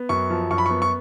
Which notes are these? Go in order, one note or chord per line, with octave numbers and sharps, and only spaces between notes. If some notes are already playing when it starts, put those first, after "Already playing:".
Already playing: B3
F#2 C#6
F3
F#2 C#6
B5
B3 C#6
C#6